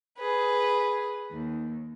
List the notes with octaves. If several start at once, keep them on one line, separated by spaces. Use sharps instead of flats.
G#4 B4
D#2